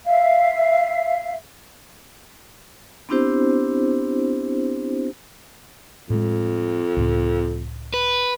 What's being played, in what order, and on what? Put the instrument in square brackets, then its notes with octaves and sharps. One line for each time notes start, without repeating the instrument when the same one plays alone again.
[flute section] E5 F5
[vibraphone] B3 C4 D4 E4 G4 C5
[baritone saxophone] F2 [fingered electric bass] A2 G#3
[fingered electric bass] C#2 A2
[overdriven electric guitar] B4